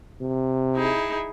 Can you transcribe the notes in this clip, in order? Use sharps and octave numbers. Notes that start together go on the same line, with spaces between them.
C3
D#4 E4 G#4